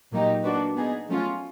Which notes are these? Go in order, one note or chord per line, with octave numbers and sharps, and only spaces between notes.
A#2 F#3 A#3 D#4 G4
A#3 D4 F#4 B4
B3 D#4 G#4
F#3 A3 C#4 F4